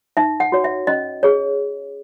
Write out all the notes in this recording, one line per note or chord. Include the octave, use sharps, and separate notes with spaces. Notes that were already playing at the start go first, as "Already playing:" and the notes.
D#4 E5
F#5
F#4 C#5
E5
C#4 D#5
G#4 C#5